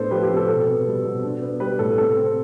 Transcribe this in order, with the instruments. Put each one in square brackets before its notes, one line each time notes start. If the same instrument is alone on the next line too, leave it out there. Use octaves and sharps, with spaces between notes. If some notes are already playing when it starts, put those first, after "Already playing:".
Already playing: [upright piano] A2 B3 D4 A4 C5
F3 G4 B4
G4
C3
A4
B2 A4
B3
G3
B2
D4
B3
G3 G4 B4
A2 A4
C3 A4
C4